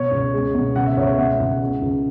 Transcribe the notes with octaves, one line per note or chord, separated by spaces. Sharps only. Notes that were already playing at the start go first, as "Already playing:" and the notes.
Already playing: B2 C#5
C#2
G#3
B2
C#3 F#5
E5
C#2 C#5
E5
B2 F#5
C#2
C#3
C#2